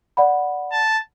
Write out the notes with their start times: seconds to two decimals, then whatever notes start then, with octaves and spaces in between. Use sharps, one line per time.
0.17 D5 F#5 B5
0.72 A5